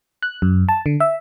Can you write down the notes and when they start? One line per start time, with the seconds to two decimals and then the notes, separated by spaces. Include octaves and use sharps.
0.23 F#6
0.42 F#2
0.69 A5
0.86 D3
1.00 E5